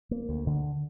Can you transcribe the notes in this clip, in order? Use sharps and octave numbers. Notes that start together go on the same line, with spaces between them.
A#3
D2
D3